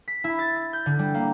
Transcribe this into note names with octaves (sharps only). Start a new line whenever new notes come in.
B6
E4
A6
A6
G6
D3
G3
A#3